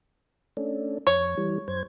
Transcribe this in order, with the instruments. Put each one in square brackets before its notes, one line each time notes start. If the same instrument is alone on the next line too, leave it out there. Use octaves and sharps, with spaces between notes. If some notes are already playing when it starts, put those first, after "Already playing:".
[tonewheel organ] A3 C#4 D4
[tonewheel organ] F2 [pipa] C#5
[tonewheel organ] E3 G3
F#2 C5 G#6